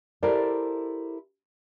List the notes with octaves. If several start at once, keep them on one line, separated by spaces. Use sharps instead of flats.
E4 G4 A4 A#4 C5 D5